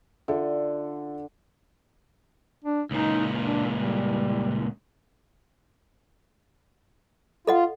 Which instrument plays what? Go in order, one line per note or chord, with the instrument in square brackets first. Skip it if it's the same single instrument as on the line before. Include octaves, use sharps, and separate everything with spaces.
[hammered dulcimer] D3 [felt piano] F4 A4 E5
[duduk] D4
[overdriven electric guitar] C#2 A#2 [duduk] D#4
[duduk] D4
G3
[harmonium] F4 [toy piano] A4 D#5 F#5